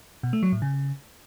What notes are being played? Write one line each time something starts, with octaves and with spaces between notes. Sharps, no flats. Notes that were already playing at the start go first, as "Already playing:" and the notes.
B2
A3
F#3
A2
C#3